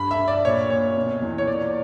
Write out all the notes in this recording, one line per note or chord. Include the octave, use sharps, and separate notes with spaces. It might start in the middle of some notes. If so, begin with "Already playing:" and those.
Already playing: G2 B5
E5
G2
D5
A#2 C#5
A#2 C#5
B2
E2
C#5
A#2 D5